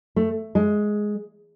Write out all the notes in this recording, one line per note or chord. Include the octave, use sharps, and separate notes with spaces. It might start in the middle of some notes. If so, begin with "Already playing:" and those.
A3
G#3